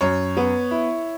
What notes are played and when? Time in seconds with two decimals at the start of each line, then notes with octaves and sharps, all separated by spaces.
0.01 F#2 C#5
0.37 B3
0.71 E4